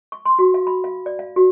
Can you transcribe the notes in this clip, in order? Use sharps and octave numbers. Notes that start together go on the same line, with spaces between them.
C#6
C6
F#4
F5
B5
F5
D5
F5
F#4